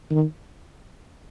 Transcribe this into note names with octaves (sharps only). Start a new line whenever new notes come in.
D#3